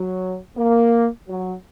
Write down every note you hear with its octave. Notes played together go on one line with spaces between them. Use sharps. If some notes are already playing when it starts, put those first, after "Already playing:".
Already playing: F#3
A#3
F#3